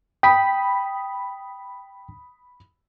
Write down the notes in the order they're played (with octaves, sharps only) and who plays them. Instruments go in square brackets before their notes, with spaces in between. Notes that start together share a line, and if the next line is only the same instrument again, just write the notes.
[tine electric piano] G5 B6 [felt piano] B5 D#6